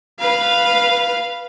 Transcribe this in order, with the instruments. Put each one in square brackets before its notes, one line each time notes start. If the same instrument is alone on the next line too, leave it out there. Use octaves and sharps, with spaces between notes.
[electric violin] B4 F5